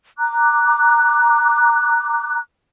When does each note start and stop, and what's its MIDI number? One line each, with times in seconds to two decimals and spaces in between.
0.18 2.38 82
0.18 2.38 86
0.18 2.38 90